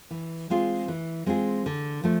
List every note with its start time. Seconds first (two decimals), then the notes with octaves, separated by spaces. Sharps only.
0.11 E3
0.50 G#3 C4 F4 G#4
0.88 E3
1.26 G#3 C4 F4 G#4
1.66 D3
2.04 F3 A3